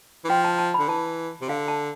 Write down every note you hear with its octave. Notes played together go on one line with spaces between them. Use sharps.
E3
F3 G5
A5
A5
D3 B5
E3 A5
C3
D3 F5
A5